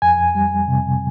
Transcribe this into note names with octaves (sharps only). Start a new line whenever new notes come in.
F2 G#5
G3
C3